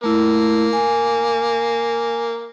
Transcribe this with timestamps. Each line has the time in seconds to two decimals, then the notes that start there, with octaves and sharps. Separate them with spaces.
0.04 A3 A#3 E4
0.73 G#5